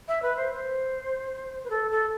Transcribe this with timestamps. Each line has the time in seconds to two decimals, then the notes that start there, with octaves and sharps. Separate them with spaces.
0.08 E5
0.22 B4
0.37 C5
0.52 C5
1.64 B4
1.70 A4
1.91 A4